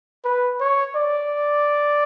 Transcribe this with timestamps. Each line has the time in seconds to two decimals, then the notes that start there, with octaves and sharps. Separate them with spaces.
0.25 B4
0.60 C#5
0.96 D5